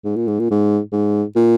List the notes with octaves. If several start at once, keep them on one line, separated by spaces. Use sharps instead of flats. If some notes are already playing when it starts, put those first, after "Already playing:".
G#2
A#2
G#2
A#2
G#2
G#2
A#2